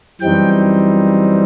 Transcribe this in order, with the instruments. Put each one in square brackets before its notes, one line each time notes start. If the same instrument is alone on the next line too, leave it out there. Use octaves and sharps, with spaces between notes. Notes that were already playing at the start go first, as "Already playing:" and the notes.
[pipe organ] F#2 E3 G3 C4 D#4 G5